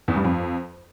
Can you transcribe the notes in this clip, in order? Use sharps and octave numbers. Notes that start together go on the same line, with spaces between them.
E2
G2
F2